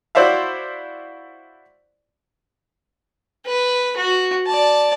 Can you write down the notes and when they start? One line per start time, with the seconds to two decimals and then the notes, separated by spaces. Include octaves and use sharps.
0.15 E4 F#4 C5 D5 E5 F5
3.46 B4
3.96 F#4
4.47 D5 A5